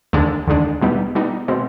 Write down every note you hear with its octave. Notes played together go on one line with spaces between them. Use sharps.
D#2 D3 G#3 D4
D#2 D3 G#3 D4
B2 G3 B3 D#4
B2 G3 B3 D#4
B2 G#3 C4